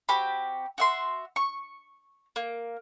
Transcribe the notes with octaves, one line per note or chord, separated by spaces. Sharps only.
C4 F#4 G4 B5
F#4 E5 C6
C#6
A#3